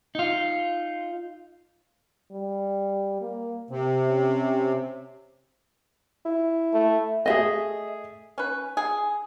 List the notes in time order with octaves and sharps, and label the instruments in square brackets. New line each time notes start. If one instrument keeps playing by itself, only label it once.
[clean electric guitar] D#4 F4
[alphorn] G3
A#3
[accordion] C3 [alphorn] C4
[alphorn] C#4
[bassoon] E4
[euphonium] A3
[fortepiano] A3 G#4 [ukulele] D#5 E5
[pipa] C#4 B4
G#4